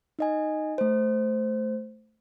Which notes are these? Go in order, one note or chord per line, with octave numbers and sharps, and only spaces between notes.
D#4 D#5 G#5
A3 C5